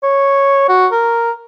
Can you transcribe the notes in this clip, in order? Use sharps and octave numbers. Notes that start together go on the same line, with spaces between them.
C#5
F#4
A#4